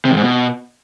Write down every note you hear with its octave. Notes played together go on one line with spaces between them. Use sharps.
C3
E2
G#2
B2